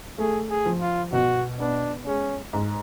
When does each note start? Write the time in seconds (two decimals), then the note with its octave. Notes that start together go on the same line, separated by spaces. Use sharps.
0.18 A3 G#4
0.50 G#4
0.66 F3
0.81 F4
1.13 B2 F#4
1.60 B3 D4
2.06 G#3 C#4
2.53 G#2